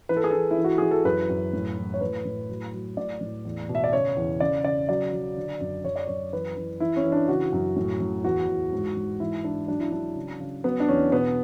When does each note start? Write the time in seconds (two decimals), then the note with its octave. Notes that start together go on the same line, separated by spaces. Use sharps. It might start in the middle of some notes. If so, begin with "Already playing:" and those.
0.09 E3 B4
0.17 A4
0.24 G#4
0.31 E3 A4
0.51 E4
0.57 E3
0.64 F#4
0.78 E3 G#4
0.91 A4
1.05 F#2 B4
1.30 F#2
1.53 A2
1.77 E3
1.94 C#5
2.01 A2 B4
2.25 A2
2.49 F#3
2.73 F#3
2.97 A2 D5
3.21 A2
3.45 E2
3.69 B2
3.75 E5
3.84 D5
3.93 C#3 C#5
4.17 E2
4.40 C#3 D5
4.64 C#3 D5
4.89 F#3 D5
5.13 F#3
5.37 D3
5.61 F#2
5.84 F#2 C#5
5.96 D5
6.07 F#2 C#5
6.33 E3 B4
6.56 E3
6.80 E3 E4
6.96 C#4
7.04 E3
7.12 D4
7.28 C#3 F#4
7.53 F#2
7.76 A2
8.00 A2
8.24 E2 F#4
8.48 E2
8.72 G#2
8.96 G#2
9.20 E3 E4
9.44 E3 D4
9.68 F#3 D4
9.80 E4
9.92 F#3 D4
10.16 C#3
10.40 C#3
10.64 F#3 B3
10.80 D4
10.88 E2 C#4
11.12 B2 B3